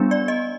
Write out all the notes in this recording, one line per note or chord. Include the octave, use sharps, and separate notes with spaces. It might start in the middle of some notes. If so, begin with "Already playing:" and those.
Already playing: G3 B3 D4
D5
D#5